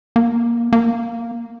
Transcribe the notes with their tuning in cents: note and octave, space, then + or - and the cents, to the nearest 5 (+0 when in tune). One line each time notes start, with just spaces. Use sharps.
A#3 +15
A#3 +0